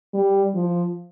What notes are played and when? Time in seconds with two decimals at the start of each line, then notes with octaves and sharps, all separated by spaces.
0.14 G3
0.55 F3